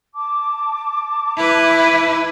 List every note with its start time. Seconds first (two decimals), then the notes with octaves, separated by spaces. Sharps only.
0.15 A5 D6
1.37 E4 B4